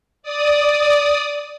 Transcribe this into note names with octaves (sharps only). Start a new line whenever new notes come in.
D5 D#6